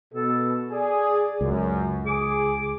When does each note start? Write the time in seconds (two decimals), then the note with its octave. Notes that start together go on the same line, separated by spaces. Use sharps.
0.14 B2 A4
0.71 G#4 D5
1.41 C#2 F#2
2.06 G#4 D6